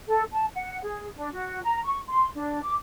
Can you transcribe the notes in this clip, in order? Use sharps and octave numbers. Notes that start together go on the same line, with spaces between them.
A4
A5
F#5
G#4
D4
F#4
A#5
C#6
C6
D4
D6